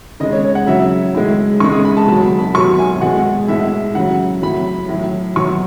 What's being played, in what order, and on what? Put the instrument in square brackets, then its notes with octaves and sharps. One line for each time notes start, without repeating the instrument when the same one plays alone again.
[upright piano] C#3 D#5
G#3
C#5
C#5
F#5
C#3 F#3 E5
A2 G#3
C#3 G#3 C#6
D#6
B5
A5
B2 A5
F#3
B5
B5
F#3 C#6
B2
G#5
B2 G#3 F#5
A2 G#3 E5
C#3 F#3 F#5
A2 F#3 B5
A2 F#3
B2 F#3 C#6